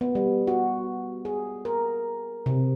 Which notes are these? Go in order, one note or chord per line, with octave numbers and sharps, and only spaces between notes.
B3
G3
F#4
G#4
A#4
C3